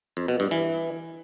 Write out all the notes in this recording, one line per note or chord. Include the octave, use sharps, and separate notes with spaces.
F2
B2
G2
E3